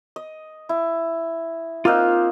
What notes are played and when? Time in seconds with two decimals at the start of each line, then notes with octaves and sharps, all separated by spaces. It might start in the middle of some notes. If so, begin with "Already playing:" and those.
0.16 D#5
0.69 E4
1.85 A#3 C4 D#4 F4 F6 F#6